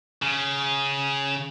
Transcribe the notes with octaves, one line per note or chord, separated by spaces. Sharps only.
C#3